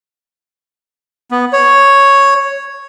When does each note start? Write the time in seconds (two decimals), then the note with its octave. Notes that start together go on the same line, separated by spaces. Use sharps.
1.31 B3
1.53 C#5